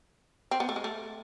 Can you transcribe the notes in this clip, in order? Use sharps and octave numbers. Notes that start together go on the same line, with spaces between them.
C4
B3
A3
G#3
A3